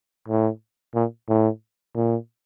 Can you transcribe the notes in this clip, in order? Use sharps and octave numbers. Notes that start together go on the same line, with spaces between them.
A2
A#2
A2
A#2